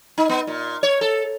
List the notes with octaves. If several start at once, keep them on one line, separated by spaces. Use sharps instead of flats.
D#4
B3
A#2
C#5
A4